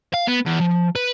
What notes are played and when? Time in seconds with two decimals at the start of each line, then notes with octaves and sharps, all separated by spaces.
0.14 F5
0.27 B3
0.46 E2
0.60 F3
0.96 B4